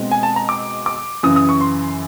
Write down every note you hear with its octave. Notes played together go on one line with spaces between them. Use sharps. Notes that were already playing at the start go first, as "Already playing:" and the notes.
Already playing: B2 G#3 C4
G#5
A5
A#5
D6
D6
F#2 C#3 E3 D#6
D#6
C#6
C6